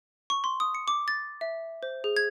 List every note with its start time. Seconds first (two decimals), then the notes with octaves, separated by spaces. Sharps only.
0.30 C#6
0.44 C6
0.60 D#6
0.75 C#7
0.88 D6
1.08 A6
1.41 E5
1.83 C5
2.04 G#4
2.17 G#6